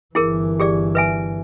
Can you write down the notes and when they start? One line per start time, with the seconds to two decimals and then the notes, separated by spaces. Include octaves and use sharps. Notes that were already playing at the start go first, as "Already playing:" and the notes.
0.15 G1 E3 E4 G#4 A#4
0.60 G4 G#4 D5
0.95 B4 E5 G#5